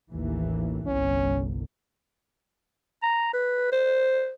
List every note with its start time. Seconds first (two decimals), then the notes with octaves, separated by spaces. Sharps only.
0.12 A1 D#2 E3
0.87 G1 C2 C#4
3.03 A#5
3.33 B4
3.72 C5